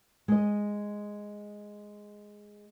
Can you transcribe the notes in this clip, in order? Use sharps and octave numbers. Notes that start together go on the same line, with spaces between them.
G#3 D#5